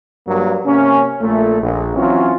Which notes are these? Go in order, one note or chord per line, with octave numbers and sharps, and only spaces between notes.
G2 F#3 A#3
C3 A#3 C#4
A#1 A#2 A3
A#1
E3 F#3 C4 C#4 F4